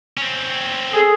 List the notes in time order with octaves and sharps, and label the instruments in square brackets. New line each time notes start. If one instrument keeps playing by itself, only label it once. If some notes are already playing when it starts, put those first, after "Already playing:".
[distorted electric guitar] C4 C#4
[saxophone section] G#4 [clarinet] A4